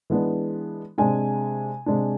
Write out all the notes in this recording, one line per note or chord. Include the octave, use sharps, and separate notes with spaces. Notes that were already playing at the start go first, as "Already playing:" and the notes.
E3 G#3 B3 D4
C3 G#3 D4 G#5
C3 G#3 D4